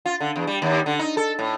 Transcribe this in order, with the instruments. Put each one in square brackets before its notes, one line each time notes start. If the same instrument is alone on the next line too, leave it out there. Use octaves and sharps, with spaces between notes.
[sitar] F4
D3
E2
G3
D#2
D3
D#4
A4
A2